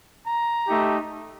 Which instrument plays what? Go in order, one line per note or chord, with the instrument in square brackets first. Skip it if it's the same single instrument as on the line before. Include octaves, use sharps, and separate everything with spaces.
[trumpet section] A#5
A3 D#4 G4